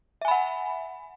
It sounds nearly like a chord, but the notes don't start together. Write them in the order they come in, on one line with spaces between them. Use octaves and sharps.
E5 G#5 B5 F#5